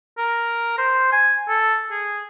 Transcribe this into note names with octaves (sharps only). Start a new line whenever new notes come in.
A#4
C5
G#5
A4
G#4